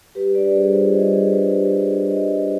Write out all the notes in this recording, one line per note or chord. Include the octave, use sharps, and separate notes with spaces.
G3 G4 B4
D4 B4 D5
G3 G#4 C5
F4 G#4 C5
G3 C5 D#5
D4 G#4 C5
G3 G4 B4
F4 G4
G3 G#4
D4
G3 C5 D#5
F4